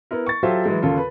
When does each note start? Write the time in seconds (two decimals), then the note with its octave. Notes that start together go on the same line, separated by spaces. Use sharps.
0.11 B3 E4 A#4
0.26 C#6 A6
0.43 F#3 F4 G4 A4 C5 E5
0.65 E3 F#3 G#3
0.82 D#2 C#3 F4 A4
0.97 B4